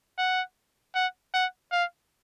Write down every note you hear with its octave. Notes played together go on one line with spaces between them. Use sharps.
F#5
F#5
F#5
F5